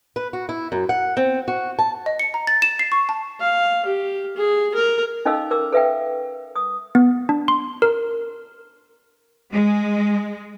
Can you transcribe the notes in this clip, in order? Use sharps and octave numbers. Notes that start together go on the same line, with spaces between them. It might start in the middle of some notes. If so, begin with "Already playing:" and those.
B4
F#4
E4
F#2
F#5
C4
F#4
A5
D#5
C#7
A#5
A6
E7
C7
C#6
A5
F5
G4
G#4
A#4
C#4 D#4 A4 D#5 F5 E6
A#4 D6 E6
A4 B4 E5 F5 G5
D#6
B3
D4
C6
A#4
G#3